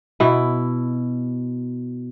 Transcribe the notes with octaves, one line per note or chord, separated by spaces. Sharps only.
B2 E4